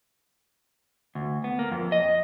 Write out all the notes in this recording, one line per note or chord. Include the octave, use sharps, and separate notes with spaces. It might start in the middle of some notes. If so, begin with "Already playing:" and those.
D2
B3
A#3
F2
D#5